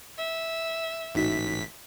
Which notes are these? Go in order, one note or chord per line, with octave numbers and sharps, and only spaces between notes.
E5
A1 G#2 D#4 F#4 B6